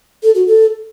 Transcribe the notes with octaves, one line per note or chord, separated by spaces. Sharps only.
A4
F#4
A4